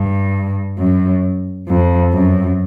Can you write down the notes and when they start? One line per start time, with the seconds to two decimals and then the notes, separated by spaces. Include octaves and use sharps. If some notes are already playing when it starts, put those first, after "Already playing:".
Already playing: G2
0.78 F#2
1.68 F2
2.13 F#2